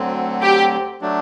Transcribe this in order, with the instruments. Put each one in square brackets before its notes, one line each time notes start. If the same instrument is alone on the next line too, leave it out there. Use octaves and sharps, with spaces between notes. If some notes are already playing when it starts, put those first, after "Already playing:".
Already playing: [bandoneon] D2 D3 F#3 C4
[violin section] G4
[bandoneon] F#3 A3 D4